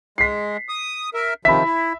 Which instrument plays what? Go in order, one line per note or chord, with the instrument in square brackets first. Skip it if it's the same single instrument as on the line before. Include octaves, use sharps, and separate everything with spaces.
[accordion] G#3 [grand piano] B6 C7
[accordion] D#6
A#4 E5
[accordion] C3 D#3 F3 [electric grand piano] E5 [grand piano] B5 B6
[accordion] E4